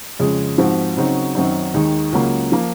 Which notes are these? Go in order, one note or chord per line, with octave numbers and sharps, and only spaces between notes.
F2 C#3 G#3
G#2 F3 C4 F#4
C#3 F#3 C4 D#4 F#4
F#2 D#3 F#3 C4 D#4
D#2 D#3 G#3 D#4
C#2 C#3 F#3 A#3
F3 A#3